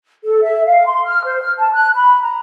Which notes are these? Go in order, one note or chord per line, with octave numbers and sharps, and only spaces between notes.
A4
E5
F5
C6
F6
C5
F6
A5
F#6
B5
A#5